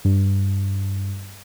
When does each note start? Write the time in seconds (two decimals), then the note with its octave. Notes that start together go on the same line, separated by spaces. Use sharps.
0.05 G2